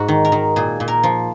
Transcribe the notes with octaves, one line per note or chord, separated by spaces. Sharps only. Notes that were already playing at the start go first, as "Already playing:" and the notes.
Already playing: G#2 F#4
D#3
A#4
D#3
A#2 G#4
A#2
A#4
F3